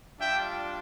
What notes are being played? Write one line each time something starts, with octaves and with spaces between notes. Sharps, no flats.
G3 D4 F4 E5 G5